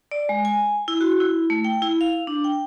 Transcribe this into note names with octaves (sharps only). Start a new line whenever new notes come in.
D5
G#3
G#5
E4
F#4
E4
A3
G5
E4
F5
D4
G5